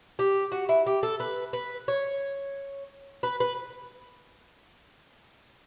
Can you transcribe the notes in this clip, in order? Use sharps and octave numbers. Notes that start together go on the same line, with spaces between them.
G4
F#4
E4
G4
A4
B4
B4
C#5
B4
B4